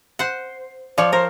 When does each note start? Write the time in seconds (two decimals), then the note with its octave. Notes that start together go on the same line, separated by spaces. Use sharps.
0.19 C5 F#5
0.98 F3 C#5 D5
1.13 A#4 C5